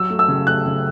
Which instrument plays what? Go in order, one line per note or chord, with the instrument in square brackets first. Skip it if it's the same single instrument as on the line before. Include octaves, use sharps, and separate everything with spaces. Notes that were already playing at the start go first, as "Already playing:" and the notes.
Already playing: [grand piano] F#3 [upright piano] E6
[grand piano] A3
[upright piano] E6
[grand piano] C#3
[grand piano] A3 [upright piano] F#6
[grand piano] C#3